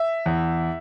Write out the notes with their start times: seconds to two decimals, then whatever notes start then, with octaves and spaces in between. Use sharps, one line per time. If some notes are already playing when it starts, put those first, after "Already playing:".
Already playing: E5
0.26 E2